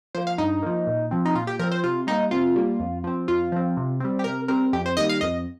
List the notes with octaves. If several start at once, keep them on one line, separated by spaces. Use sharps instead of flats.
F3 A#3 C5
F5
G2 D#4
F3 A#3
A#2
F3 C4
D#4
A#2 F4
G4
F3 C4 A#4
C5
C3 F4
G3 A#3 D#4
C3 F4
G3 A#3
F2
F3 C4
F2 F4
F3 C4
C3
G3 C4
G4
C3 A#4
G3 C4 A#4
F2 G4
C5
D#3 G3 A#3 D#5
F5
F2 D#5